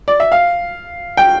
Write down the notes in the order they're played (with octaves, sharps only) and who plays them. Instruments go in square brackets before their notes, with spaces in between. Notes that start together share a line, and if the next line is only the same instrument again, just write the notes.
[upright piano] D5
E5
F5
G5